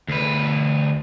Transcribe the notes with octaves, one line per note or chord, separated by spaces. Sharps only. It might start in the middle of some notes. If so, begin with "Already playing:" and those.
D2 B4